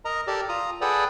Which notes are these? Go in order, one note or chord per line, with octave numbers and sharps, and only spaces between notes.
A#4 D#5 A#5
G4 A4 A#4 D5
F4 A#5 D#6
G#4 A4 B4 D5 F#5 G5